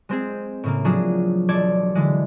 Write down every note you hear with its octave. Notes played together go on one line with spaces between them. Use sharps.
G#3 C4 G#4
A2 C#3 A#3
F3 F#3 D4 G#4
E1 A4 D5 D6 G#6
D3 E3 G#3